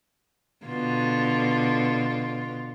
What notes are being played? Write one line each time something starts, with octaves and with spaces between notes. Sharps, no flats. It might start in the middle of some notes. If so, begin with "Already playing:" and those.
B2 D3 F4